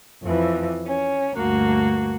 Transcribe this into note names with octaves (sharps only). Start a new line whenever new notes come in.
F2 E3
C#4
D2 G2 A#3 F#4